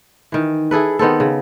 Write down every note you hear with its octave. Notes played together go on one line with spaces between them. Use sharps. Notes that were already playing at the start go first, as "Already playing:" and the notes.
D#3 E3
E4 G#4 A4 B4
D#3 B3 C4 A4
C#3